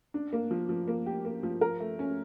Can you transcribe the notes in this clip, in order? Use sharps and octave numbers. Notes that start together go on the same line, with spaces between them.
D4
A#3
F3
F3
A#3
G4
A#3
F3
A#4
A3
C#4